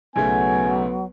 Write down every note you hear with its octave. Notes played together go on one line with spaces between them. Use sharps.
B1 C#3 F#3 A3 B3 G#5